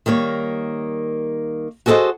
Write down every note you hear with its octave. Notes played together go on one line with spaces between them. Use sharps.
D#3 G3 A#3 C#5
F#4 G#4 A4 B4 C5 D#5